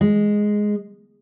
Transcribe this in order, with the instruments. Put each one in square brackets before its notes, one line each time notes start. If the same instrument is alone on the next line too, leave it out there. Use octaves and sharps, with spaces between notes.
[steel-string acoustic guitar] G#3